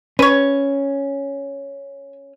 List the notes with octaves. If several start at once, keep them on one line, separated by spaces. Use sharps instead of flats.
C#4 B4 C#5